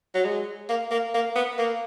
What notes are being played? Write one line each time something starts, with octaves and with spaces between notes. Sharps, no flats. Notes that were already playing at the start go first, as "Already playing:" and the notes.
F#3
G#3
A#3
A#3
A#3
B3
A#3